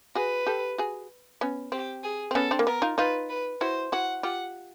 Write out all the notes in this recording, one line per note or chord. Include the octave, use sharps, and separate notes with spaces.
F#4 G#4 B4
G4 A4
F#4 G#4
B3 C#4
C4 G4
G#4
C4
B3 C#4 A4
C4 D4
A#3
B3 A#4
D#4 F4
D#4 F4 B4
B4
E4 F#4 C5
E4 F#4 F#5
F4 G4 F#5